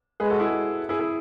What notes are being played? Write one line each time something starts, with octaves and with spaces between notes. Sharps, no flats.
G#3 G#4 B4
F#4 A4
E4 G#4
E4 G#4
E4 G#4